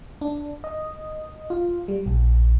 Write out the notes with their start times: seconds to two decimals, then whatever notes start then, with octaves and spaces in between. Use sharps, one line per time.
0.21 D4
0.64 D#5
1.50 F4
1.88 G3
2.06 A#1